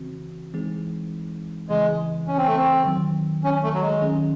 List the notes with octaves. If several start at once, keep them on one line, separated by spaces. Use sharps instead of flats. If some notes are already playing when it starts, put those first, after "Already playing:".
Already playing: C#3 E3 C4 F#4
E3 G#3 C4 D#4 G#4
C#3 E3 G#3 C4
C#4
C4
A3
C4
D#3 F#3 C4
C#4
A3
F#3
G#3
D#3 F#3 A3 C#4 G#4